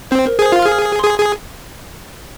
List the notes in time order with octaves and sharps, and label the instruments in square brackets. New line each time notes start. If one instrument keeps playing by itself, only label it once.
[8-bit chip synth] C4 [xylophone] C5
[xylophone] A#4
[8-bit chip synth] G#4 [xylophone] C5
[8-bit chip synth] F4 [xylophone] F5
[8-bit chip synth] G#4 [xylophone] F6
[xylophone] F6
C6
[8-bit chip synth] G#4 [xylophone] D#6
[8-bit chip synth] G#4